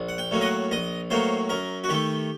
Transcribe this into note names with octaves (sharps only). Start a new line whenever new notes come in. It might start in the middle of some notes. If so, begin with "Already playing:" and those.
Already playing: A#1
F#5
G5
A2 F#3 A#3
D#5
F#5
A#1 D#5
A2 F#3 A#3 C5
F#2 A#4
F#4
D#3 A3 G4